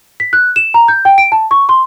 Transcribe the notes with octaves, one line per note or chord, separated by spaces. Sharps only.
B6
F#6
E7
A#5
G6
G5
D7
A5
C#6
C6